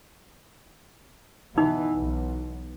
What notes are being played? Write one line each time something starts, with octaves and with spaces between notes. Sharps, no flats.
B2 E3 D#4
B1